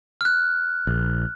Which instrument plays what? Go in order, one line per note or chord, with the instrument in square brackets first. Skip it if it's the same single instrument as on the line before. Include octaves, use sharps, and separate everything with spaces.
[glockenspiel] F6 F#6
[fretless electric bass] A#1